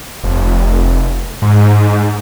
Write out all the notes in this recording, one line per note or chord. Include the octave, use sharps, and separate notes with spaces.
F1
G#2